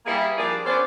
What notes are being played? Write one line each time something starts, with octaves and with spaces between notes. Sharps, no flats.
G3 A#3 E4 G#4
F3 G3 D4 G#4 A#4 D5
B3 C#4 D4 C5 D5